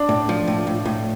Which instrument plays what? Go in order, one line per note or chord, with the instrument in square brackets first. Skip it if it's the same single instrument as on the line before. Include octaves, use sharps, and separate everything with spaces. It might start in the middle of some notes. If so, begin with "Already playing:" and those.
Already playing: [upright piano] D4
[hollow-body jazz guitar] A2
F3
A2
A2
A2